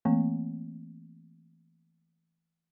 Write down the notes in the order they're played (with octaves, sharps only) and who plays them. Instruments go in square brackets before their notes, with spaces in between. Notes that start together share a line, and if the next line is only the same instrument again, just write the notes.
[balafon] E3 A3 A#3 C4